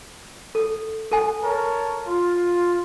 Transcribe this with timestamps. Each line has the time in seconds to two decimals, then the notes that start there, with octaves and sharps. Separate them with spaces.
0.55 A4
1.11 A4 G#5
1.41 A#4 C#5 A5
2.05 F4